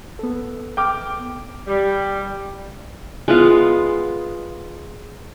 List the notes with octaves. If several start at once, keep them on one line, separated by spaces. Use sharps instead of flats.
B3 A4
G5 D6 F6
G3
G#3 B3 F4